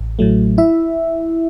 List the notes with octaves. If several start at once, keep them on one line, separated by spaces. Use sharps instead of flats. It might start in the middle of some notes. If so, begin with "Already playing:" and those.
Already playing: A1
A2 F#3 A3
E4 E5